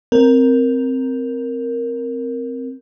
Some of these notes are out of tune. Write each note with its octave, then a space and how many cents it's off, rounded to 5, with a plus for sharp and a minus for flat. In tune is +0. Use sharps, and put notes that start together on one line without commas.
C4 +0 A#4 +0